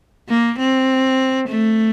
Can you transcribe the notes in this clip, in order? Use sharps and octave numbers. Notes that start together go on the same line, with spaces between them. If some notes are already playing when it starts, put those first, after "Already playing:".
A#3
C4
A3